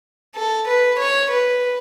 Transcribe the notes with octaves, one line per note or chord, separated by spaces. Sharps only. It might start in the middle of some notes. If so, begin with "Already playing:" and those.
A4
B4
C#5
B4